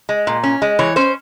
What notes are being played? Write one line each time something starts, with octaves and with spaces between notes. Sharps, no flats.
G#3
A#2
C#4
G#3
E3 C#5
C#4 C5